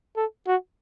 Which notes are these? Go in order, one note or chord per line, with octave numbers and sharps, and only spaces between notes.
A4
F#4